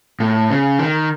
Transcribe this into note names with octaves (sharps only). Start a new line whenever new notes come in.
A2
C#3
D#3